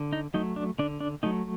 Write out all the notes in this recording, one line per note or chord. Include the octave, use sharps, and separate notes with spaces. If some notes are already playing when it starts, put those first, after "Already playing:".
Already playing: D3
D#4
F#3 A3 D#4
D4
D3 D4
D4
F#3 A3 D#4